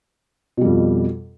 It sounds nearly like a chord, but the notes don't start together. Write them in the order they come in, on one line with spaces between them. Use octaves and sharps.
B2 G3 F2